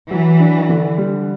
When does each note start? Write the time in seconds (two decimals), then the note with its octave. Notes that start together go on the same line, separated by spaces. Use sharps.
0.11 E3 F#3
0.40 D4
0.69 D3
0.98 G3